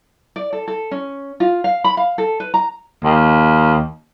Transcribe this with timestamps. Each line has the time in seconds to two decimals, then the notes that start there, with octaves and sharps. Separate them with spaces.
0.36 D5
0.53 A4
0.68 A4
0.91 C#4
1.40 F4
1.64 F5
1.84 B5
1.97 F5
2.18 A4
2.40 B4
2.54 A#5
3.03 D#2